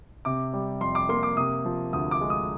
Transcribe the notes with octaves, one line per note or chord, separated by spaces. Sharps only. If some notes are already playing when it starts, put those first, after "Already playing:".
C3 D6
G3
F2 C6
D6
A#3 C6
D6
C3 D#6
F3
D2 D#6
D6
G#3
D#6